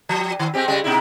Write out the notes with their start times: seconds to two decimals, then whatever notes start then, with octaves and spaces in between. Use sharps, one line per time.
0.09 F3
0.39 D#3
0.54 G#3 C4 G4
0.68 C#3 G3 G#3
0.84 B2 D#4 E4